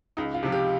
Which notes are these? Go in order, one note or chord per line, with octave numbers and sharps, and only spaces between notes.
C#2 D#4
F4
C3 F3
G4